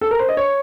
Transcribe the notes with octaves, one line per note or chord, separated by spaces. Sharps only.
A4
A#4
C5
D#5
C#5